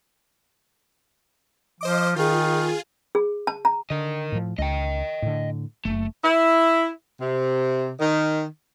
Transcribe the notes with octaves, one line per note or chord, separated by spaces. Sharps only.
F3 C5 D#5 D6
D#3 F4 G#4
G#4
A5
A#5
D3 A#4 D#5
A2 F3
C#2 D#5 G5
A2 D3
F#1 A3
E4
C3
D#3